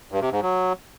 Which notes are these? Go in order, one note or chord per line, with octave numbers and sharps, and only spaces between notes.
G2
C3
G#2
F#3